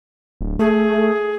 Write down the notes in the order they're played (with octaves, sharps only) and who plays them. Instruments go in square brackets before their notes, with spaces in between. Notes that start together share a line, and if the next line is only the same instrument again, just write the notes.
[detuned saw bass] D1
[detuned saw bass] A3 [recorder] G#4